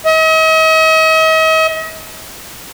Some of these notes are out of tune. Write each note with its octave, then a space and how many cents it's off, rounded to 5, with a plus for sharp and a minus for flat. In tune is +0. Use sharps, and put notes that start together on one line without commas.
D#5 +40